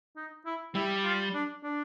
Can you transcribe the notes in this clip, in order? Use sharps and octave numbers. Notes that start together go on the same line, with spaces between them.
D#4
E4
G3 E4
F4
D4
D4